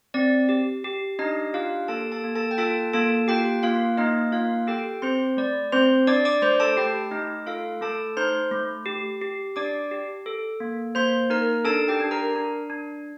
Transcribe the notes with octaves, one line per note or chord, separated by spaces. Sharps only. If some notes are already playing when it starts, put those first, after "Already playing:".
C4 D5
G4
G4
D4 D#4 D#5
F4 G4 F5
A#3 A4 A5
A4 A5
A#3
A4 A5
G5
F4 A4 A5
A#3 A4 A5
F4 G4 G5
A#3 F4 F5
A#3 D#4 D#5
A#3 F4 F5
G4 A4 G5
C4 C5 C6
A3 D5
C4 C5 C6
D4 D5 D6
D5 D6
A3 C5 C6
A4 A5
A3 G4 G5
A3 D#4 D#5
F4 A4 F5
A3 A4 A5
D#4 C5 C6
A3
G4
G4
D4 D5 D6
G4
A4
A#3
A#3 C5 C6
D#4 A#4 A#5
D4 A4 A5
G4 G5
D4
A#4 A#5
D4
D4